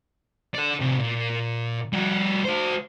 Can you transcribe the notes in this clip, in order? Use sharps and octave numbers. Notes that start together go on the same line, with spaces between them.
A4 D5
A2 C3
A#2
G3 F#4
F#4 C5